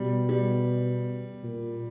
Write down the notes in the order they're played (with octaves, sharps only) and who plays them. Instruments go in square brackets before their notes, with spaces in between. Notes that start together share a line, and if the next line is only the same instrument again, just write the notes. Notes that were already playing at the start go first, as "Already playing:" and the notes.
Already playing: [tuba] B2 [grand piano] G3
[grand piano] G3
[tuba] A#2